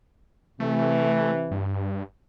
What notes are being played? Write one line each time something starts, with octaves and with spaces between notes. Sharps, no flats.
C3 E3 A3
G2